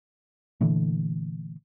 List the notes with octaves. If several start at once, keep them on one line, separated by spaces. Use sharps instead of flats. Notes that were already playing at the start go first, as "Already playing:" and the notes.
A#2 D3 E3 A3